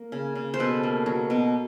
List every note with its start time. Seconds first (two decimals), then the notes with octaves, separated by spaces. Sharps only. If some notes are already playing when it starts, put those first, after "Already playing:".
Already playing: A#3
0.12 C#3
0.35 C#3
0.54 C5
0.59 B2 A4 B4
0.83 A#3
1.06 F#3
1.30 B2